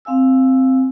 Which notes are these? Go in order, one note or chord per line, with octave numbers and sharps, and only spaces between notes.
C4 F5 G#5 E6